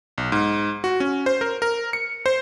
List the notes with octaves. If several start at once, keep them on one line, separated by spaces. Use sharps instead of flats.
B1
G#2
F#4
C#4
C5
A#4
A#4
C#7
C5